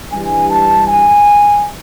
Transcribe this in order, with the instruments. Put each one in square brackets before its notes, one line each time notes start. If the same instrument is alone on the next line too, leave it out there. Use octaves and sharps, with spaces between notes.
[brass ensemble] G2 E3 G3 G#5
A5
G#5